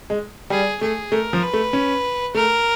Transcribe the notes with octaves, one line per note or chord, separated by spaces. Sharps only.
G#3
G3 G#4
A3 G#4
A3 A#4
F3
B4
A3
C#4
A3 A#4